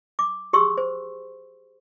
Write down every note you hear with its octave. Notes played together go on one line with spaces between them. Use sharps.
D6
G4 G#4 C6 C#6 E6
C5